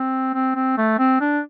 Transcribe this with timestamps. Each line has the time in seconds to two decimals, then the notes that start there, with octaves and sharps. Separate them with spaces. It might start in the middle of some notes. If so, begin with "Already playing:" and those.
Already playing: C4
0.34 C4
0.56 C4
0.77 A3
0.99 C4
1.21 D4